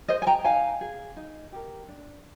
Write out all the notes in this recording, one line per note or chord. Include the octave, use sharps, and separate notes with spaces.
G#4 C5 D#5
G#5
G5 A#5
D#4 F5 G#5
G#4
D#4
G4 A#4
D4